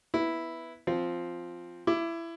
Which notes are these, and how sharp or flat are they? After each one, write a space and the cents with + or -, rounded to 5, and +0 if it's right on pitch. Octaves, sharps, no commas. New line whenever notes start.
B3 +0 E4 +0
F3 +0 C4 +0
E4 +20 D6 +0